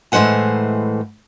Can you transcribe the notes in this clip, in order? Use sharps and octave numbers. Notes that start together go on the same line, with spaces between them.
A2 E3 G#3 C5 F#5 G#5